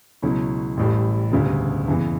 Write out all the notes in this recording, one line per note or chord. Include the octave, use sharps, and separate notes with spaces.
C#2 B2 F#3 C#4 E4
A1 A2 G3
E1 D2 C#3 G3
F#1 E2 C#3 E3